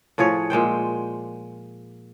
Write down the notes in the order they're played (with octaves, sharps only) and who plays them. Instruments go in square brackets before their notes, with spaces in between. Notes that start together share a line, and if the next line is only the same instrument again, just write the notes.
[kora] A2 F3 G#4 C#5
A#2 G#3 C5 G5